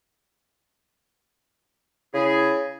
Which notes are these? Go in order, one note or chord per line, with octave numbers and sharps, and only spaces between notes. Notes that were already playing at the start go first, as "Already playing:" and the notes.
C#3 E4 G#4